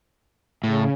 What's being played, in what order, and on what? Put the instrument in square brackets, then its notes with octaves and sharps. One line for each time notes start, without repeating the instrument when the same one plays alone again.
[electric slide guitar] A2 [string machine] C#3